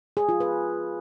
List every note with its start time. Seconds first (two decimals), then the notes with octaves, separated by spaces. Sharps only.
0.17 G#4
0.29 F4
0.40 B4